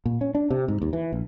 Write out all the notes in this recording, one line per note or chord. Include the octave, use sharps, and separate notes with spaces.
A#2
C#4
D4
C3
G#2
D#2
E3
A#1